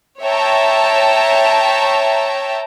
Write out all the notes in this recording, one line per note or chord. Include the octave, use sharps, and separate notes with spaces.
C#5 E5 G5 A5 A#5